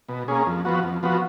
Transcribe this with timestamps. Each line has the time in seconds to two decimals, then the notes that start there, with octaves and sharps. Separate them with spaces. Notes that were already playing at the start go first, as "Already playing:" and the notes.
0.09 B2
0.28 A#3 C#4 G#4
0.47 F2
0.65 F3 B3 F#4
0.83 F2
1.03 F3 B3 F#4